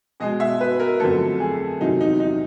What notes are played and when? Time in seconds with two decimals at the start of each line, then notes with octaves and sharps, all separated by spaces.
0.20 B2 G#3 D#5
0.40 E5
0.60 B4
0.80 A#4
1.00 F2 D3 F#3 A3 A4
1.40 G#4
1.80 E2 C3 D#3 F#3 D#4
2.01 D#4
2.20 D#4